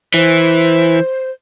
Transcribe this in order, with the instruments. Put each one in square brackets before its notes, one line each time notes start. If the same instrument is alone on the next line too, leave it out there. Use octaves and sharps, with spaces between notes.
[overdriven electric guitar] E3 [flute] C5